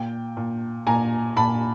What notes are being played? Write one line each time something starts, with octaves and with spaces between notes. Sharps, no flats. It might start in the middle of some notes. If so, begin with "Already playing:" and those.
Already playing: A#2 G5
A#2
A#2 G#5 A#5
A#2 A5 B5